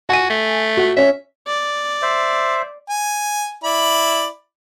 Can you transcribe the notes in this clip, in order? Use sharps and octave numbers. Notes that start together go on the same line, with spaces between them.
F#4 G#5 D#7
A3
F#4
C#4 C#5 E5
D5
C5 E5
G#5
E4 D5 B5